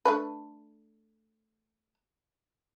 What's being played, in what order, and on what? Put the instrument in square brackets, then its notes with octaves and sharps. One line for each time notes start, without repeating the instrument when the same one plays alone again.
[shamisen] A3 D4 B4